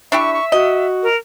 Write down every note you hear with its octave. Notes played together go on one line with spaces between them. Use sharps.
D4 E4 G4 E5 C#6
C#6
F#4 D#5
A#4